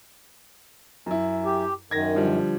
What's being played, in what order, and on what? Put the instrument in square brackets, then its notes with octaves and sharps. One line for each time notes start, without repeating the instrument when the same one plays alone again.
[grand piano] F#2 E4
[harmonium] G4
[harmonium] F#2 D#3 [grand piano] G#6 A#6
[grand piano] D3 F3 G3